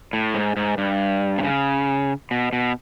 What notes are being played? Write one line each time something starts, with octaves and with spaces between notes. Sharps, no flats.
A2
G#2
G#2
G2
C3
C#3
B2
B2